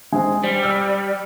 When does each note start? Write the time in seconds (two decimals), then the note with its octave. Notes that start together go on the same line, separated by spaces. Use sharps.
0.12 G#3 C4
0.44 G3 C5
0.63 E6 F6